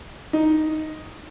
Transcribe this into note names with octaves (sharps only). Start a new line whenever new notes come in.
D#4